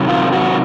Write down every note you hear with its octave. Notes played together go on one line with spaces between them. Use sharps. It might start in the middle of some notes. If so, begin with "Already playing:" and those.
Already playing: C3 D#3 F#3
F4
F#4